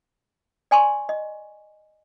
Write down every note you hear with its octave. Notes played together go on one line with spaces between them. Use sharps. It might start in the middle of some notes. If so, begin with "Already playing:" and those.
D5 G#5 C6 C#6
D#5